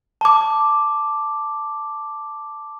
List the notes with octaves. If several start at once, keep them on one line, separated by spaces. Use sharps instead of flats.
A5 D6